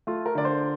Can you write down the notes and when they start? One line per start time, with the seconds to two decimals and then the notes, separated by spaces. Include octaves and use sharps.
0.07 A3 F4
0.26 A#4
0.35 D3 D5
0.45 C5